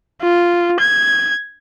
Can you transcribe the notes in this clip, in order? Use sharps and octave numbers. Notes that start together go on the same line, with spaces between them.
F4
G#6